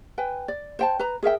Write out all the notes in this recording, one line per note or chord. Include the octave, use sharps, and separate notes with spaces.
B4 G5 G#5
D5
C5 G5 A5
B4 A#5
G#4 A#4 E5 G5